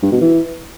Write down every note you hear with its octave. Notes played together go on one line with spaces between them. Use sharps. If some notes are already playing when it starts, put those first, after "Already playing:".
G2
B2
E3